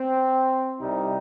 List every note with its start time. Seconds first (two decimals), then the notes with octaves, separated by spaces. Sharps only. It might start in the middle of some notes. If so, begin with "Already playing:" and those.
Already playing: C4
0.80 C2 C3 G3 D#4